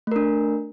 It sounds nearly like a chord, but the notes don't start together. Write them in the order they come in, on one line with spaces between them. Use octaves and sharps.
A3 A#4 D4